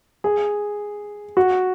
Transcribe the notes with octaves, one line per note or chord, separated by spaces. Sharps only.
G#4
F#4